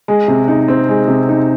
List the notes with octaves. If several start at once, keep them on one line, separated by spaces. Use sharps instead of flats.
G#3
C3
D#4
C4
G#3
C3
D#4